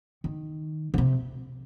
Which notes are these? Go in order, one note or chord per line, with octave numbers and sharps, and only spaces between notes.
D#3
D3
C3